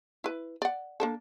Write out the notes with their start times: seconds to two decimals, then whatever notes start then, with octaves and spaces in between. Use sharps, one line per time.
0.24 E4 B4
0.62 D5 F#5
1.00 A#3 D4 A4